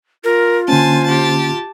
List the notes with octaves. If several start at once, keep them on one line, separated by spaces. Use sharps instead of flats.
F4 A#4
D3 A#3 C#4 C5 G#5 A5
G4 A5